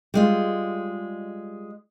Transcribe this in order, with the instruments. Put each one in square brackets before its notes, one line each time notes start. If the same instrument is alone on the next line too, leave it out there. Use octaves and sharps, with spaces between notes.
[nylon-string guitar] G3 G#3 F4